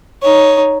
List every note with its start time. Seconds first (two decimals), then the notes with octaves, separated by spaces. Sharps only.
0.22 D#4 C#5